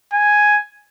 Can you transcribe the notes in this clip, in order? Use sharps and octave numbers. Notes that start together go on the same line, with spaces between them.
G#5